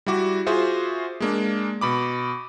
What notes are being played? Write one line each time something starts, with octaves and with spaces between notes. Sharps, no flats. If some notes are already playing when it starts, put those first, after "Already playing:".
G3 E4 F#4 D6
F4 F#4 G#4 C5 E5
G#3 A#3 D4
B2 B5 D6